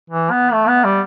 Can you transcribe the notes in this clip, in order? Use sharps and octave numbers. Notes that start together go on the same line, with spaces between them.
E3
B3
A3
B3
G3